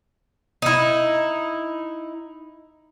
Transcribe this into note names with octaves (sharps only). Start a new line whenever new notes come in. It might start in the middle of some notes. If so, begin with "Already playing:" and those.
D#4 E4